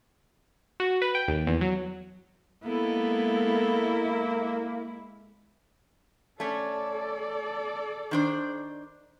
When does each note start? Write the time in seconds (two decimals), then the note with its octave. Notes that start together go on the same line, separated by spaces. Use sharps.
0.80 F#4
1.02 B4
1.15 G5
1.28 D#2
1.47 E2
1.61 F#3
2.64 G#3 A#3 B3 E4 A4
6.40 A3 C#4 A4 D5
8.11 D#3 D4 C5